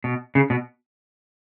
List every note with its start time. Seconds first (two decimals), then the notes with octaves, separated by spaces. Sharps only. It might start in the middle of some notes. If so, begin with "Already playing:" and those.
0.04 B2
0.35 C#3
0.50 B2